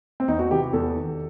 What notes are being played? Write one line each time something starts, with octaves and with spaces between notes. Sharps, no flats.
C4
E2 D#4
F#4
C3 E3 G4
E2 A4
D#3